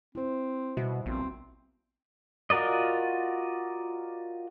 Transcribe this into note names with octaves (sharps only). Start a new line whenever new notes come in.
C4 E4 C5
B2 G3 F#4 E5
A#1 B3 C4
F4 F#4 A#4 D5 D#5